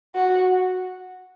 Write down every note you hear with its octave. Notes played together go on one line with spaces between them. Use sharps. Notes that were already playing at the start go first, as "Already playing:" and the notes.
F#4